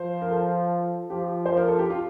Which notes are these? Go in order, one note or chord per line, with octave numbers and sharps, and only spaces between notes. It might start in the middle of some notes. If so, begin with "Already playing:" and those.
Already playing: F3 C5
A#4
A4
F3 G4
F3 C5
A#4
A4
G4
F4